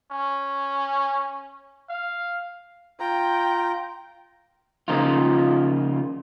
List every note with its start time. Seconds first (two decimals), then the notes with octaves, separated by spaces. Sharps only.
0.11 C#4
1.90 F5
3.00 F4 G5 A#5
4.88 C#3 F3 A#3 D#4 F4